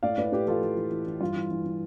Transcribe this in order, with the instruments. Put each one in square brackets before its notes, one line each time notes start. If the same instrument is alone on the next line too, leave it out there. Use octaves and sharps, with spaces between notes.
[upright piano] A2 D5 F5
A2 B4 D5
A2 G4 B4
E3 F4 A4
E3
E3
E3
E3
G2 F4
E3
E3
E3